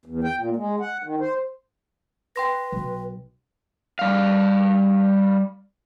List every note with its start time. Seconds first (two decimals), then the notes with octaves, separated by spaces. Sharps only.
0.06 E2
0.24 G5
0.38 A#2
0.56 G#3
0.80 F#5
1.04 D#3
1.20 C5
2.36 B4 G5 C6 A#6
2.72 B1
3.99 G3 F5